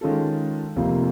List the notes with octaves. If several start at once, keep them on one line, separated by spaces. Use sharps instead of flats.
D#3 G#3 C#4 F4 A4
F1 F2 C3 F3 A#3